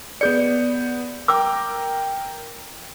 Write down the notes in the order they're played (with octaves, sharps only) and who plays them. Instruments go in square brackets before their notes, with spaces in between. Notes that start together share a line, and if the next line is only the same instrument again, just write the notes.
[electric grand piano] B3 G6 C#7 [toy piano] G#4 D5
[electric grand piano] A#4 G5 A#5 [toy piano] D6 E6